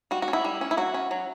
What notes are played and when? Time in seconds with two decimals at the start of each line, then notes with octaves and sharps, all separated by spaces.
0.11 G3 F#4
0.22 F#4
0.28 C#4
0.33 E4
0.45 G3
0.61 C#4
0.71 E4
0.77 F#3 F#4
0.94 C#4
1.11 F#3